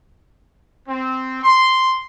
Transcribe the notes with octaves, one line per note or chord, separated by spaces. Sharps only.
C4
C6